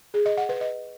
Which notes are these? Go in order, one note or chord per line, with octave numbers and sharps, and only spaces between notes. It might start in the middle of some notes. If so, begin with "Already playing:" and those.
G#4
D#5
F#5
B4
D#5